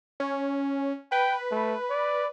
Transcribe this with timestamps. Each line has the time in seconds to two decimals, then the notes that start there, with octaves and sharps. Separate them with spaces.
0.20 C#4
1.12 B4 G5
1.51 A3
1.90 D5